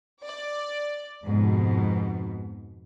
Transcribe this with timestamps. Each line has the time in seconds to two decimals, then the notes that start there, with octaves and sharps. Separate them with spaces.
0.24 D5
1.25 F2 G#2 B2